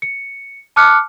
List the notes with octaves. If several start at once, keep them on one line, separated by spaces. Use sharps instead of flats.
C#7
A5 D6 F6 F#6 C#7